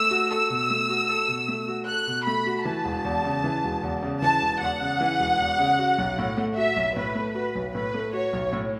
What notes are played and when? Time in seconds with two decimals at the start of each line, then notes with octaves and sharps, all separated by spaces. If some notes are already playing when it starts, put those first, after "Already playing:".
Already playing: A3 E6
0.11 F#4
0.31 A4 E6
0.50 B2
0.70 A3
0.90 F#4
1.09 A4
1.28 B2
1.48 A3
1.68 F#4
1.87 A4 F#6
2.07 B2
2.26 A3 B5
2.47 F#4
2.65 E3 A5
2.85 E1
3.05 E2
3.24 C#3
3.44 E3
3.64 E1
3.83 E2
4.03 C#3
4.22 E3 A5
4.42 E1
4.61 E2 F#5
4.80 C#3
5.01 E3
5.19 E1
5.40 E2
5.59 C#3
5.79 F#4
5.98 B1
6.19 A2
6.37 A3
6.57 F#4 E5
6.76 B1
6.96 A2 B4
7.15 A3
7.35 F#4 B4
7.55 B1
7.74 A2 B4
7.94 A3
8.13 F#4 C#5
8.33 B1
8.53 A2